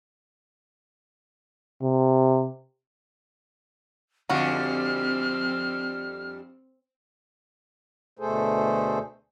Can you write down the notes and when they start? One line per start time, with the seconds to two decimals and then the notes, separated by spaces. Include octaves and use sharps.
1.82 C3
4.30 F2 D3 F3 G3 C4 F#4 F6
8.19 D2 B2 A3 G#4 A4 C5